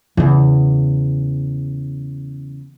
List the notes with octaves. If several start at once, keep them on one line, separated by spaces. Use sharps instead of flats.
E2 C#3